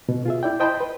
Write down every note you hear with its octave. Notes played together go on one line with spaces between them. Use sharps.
B2
F4 G#4 E5
E4 D5 G5
C5 D#5 G5 A5 B5 C6
B4